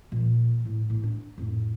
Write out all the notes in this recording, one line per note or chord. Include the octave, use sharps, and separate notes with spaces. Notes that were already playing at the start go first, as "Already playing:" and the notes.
A#2 F3
A2
A2 A#3
D4
F2 A2